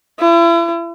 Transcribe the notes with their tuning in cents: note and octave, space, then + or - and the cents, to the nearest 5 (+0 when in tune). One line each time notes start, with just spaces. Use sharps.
E4 +40